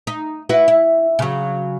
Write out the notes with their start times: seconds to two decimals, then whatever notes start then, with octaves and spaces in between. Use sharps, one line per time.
0.07 D#4
0.49 E4 F#4 B4
0.68 E4
1.19 C#3 F#3